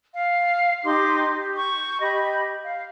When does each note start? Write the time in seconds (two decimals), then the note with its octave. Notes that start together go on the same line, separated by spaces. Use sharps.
0.14 F5
0.84 D#4 G4 C6 D6
1.33 G4
1.57 C#6 G6
2.01 G4 D#5 B5
2.65 F5